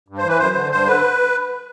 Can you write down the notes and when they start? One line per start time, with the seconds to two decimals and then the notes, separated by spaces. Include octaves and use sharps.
0.08 G2
0.18 C5
0.24 E3 B4
0.38 F#2 C5
0.55 D3
0.72 G2 C5
0.86 D3 B4